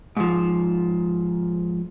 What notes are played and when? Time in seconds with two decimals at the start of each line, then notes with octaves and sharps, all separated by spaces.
0.17 G#2 F3